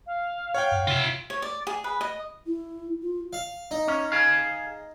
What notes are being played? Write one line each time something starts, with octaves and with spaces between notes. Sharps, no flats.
F5
C#5 F#5 G5
F#2
C3 F4 E5
C#5
D5
G#4
B4
D#5
E4
F4
F5
D#4
C#4
G#4 F5